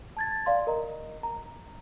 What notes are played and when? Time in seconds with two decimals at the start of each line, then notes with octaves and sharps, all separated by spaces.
0.17 A5 G#6 A6
0.46 D5 F5 C6
0.67 A#4 D#5 A#5
1.23 A#5